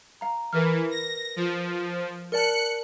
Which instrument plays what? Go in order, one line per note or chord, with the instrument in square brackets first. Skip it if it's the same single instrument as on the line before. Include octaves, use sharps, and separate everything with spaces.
[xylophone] F5 A#5
[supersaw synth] E3 [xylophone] A#4 B4 F6
[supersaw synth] A#6
F3
[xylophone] A#4 D5 A5 [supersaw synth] F#6 C#7